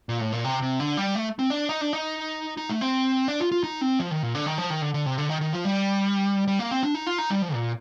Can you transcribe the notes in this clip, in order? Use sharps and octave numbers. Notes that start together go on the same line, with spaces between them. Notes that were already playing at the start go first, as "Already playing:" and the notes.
A#2
A2
A#2
C3
C3
D3
G3
A3
C4
D4
D#4
D4
D#4
D#4
A3
C4
D4
F4
F4
D#4
C4
F3
D#3
A#2
D3
D#3
F3
D#3
D3
D3
C3
D3
D#3
D#3
F3
G3
G3
A#3
C4
D4
D#4
F4
D#4
G3
F3
A#2